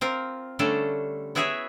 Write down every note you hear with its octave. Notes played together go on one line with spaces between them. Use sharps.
C4 F4 A#4
D3 G3 A3 C#4 D4 A4
B3 E4 F#4 G#4 C#5 E5